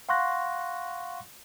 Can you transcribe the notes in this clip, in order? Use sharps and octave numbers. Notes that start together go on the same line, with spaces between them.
F5 F#5 C6 C#6 F#6 A#6